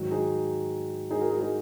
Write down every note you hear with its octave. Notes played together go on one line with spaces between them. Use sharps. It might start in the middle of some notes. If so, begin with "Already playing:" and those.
Already playing: G#2 D#3 F#3
D#4 G#4
D#4 G#4
F#4 A#4
D#4 G#4
D#4 G#4